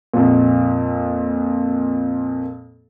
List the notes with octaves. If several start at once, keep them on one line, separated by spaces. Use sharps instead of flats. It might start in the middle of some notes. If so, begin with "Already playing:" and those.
F2 A#2